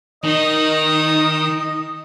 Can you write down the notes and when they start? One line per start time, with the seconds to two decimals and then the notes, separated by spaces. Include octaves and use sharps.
0.24 D#3 D#4 D#5 D#6